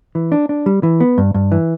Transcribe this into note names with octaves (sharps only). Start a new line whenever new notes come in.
E3
D4
D4
G3
E3
B3
G2
G2
E3